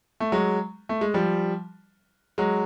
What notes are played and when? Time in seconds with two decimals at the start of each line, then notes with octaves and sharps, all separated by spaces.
0.20 A3
0.32 F#3 G#3
0.89 A3
1.01 G#3
1.14 F3 G3
2.38 F#3 G#3